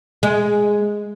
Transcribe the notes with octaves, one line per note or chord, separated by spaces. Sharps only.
G#3